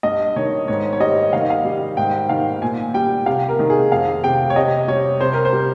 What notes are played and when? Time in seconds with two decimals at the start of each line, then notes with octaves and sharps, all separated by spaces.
0.03 G2 D#5
0.36 D#3 C#5
0.68 G#2 C#5
0.92 C#5
1.00 G3 D#5
1.33 D#3 F5
1.41 D#5
1.50 F5
1.65 G3
1.97 G#2 G5
2.29 D#3 F5
2.62 A#2 G#5
2.94 G3 G5
3.26 C3 F5
3.48 A#4
3.59 D#3
3.70 G#4
3.92 F2 F5
4.24 C3 G5
4.50 C#5
4.56 C3 D#5
4.88 G3 C#5
5.21 C3 C5
5.33 A#4
5.45 C5
5.53 G3